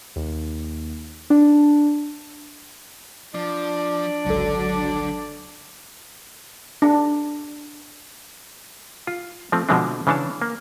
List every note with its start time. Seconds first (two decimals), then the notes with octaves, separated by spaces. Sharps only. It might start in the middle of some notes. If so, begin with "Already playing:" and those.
0.16 D#2
1.30 D4
3.35 F3 D4 D5
4.26 G#1 C#2 D3 F#3 A4
6.82 D4
9.07 F4
9.52 F3 A3 C4
9.69 B2 D3 F3 G#3 C4 D4
10.07 C#3 E3 D4 C#5 A5
10.42 A#3